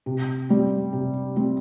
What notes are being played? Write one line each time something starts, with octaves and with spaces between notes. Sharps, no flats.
C3
G3 C4
C3
G3 C4